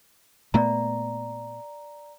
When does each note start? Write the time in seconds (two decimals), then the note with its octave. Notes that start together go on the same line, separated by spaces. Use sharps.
0.54 A#2 A3 B3 D5 A#5